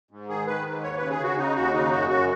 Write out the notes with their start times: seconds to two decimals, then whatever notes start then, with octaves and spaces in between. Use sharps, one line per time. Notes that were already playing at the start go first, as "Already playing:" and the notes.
0.11 G#2
0.29 D#3 G#4
0.47 D#3 B4
0.65 G#2
0.83 D#2 C#5
0.97 C#3 B4
1.10 G#4
1.19 C#3 F#4
1.37 C#3 D#4
1.55 D#2 F#4
1.73 C#3 D#4
1.91 F#2 F#4
2.09 F#2 F#4